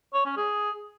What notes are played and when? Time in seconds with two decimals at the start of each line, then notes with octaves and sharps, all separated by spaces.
0.14 C#5
0.25 C#4
0.37 G#4